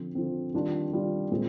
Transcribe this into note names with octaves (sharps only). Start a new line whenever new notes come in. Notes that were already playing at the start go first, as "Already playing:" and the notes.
Already playing: D3 F3 C4
D3 F3 C4
D#3 G3 D4 F4
D#3 G3 D4 F4
A#2 G#3 C4 F4 G#4